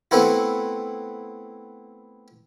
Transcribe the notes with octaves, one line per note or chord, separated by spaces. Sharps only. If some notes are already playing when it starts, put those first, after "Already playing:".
A3 B3 C4 E4 F#4